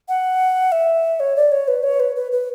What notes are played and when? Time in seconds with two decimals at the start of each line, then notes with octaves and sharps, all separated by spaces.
0.08 F#5
0.72 E5
1.20 C#5
1.36 D5
1.52 C#5
1.68 B4
1.83 C#5
2.00 B4
2.16 B4
2.32 B4